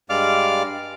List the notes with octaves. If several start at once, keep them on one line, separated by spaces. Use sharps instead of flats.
G2 G#3 D5 F5 D6 F6